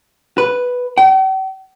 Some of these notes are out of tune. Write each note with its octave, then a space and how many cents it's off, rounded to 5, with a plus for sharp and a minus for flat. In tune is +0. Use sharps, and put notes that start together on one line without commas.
B4 +0
G5 -45